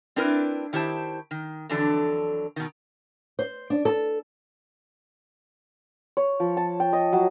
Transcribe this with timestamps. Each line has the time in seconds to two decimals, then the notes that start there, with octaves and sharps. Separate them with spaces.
0.16 C4 D4 E4 A#4 B4
0.73 D#3 E4 G4 C5 A5
1.31 D#3
1.69 F2 D3 E3 F#3 D4 A4
2.56 B2 D#3
3.39 C5
3.70 D4
3.85 A4
6.17 C#5
6.40 F3
6.57 A5
6.80 G5
6.93 D#5
7.13 F#3